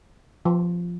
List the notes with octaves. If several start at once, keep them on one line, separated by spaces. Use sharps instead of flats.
F3